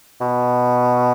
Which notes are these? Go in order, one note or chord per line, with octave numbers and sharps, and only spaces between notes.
B2